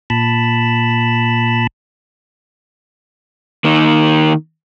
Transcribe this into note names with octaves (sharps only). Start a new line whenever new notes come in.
A#2 A5 B5
D#3 A#3